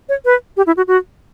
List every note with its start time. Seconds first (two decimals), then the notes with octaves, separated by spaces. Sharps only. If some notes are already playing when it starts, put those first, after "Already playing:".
0.09 C#5
0.25 B4
0.57 G4
0.67 E4
0.77 F#4
0.88 F#4